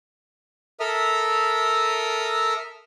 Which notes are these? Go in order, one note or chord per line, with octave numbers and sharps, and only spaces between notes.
A4 A#4 E5 D#6 F6